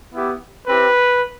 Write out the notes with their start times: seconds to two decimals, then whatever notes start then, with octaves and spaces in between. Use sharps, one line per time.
0.13 B3 E4 G4
0.67 C4 E4 G4 B4